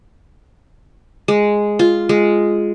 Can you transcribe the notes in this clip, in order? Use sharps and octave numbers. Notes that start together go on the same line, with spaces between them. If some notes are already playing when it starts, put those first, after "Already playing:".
G#3
F4
G#3